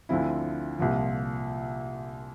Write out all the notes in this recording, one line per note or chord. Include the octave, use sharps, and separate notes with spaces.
D2 D3 F3 C4 E4
C2 A#2 F3